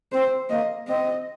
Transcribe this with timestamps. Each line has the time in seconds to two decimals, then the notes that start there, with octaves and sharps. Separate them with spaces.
0.12 C4 C5
0.50 A#3 D#5
0.87 C4 D#5